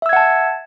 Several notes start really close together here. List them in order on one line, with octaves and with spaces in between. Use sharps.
E5 E6 G#6 F#5 A5